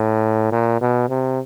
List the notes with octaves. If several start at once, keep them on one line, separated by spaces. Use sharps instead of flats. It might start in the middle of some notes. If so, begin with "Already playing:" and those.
Already playing: A2
A#2
B2
C3